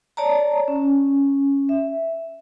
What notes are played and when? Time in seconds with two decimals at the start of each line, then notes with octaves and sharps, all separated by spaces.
0.17 C#5 D5 A5 A#5
0.68 C#4
1.69 E5